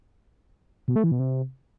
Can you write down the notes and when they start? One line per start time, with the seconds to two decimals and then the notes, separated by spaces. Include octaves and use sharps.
0.88 B2
0.96 A3
1.04 E3
1.12 B2
1.19 C3